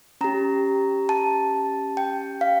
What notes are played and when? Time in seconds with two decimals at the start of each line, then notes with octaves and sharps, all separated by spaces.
0.21 C#4 G4 A#5
1.09 A5
1.97 G5
2.41 F5